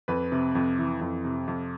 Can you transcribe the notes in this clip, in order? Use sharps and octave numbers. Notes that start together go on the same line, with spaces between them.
F2 B4
C3
F2
E3
F2
C3
F2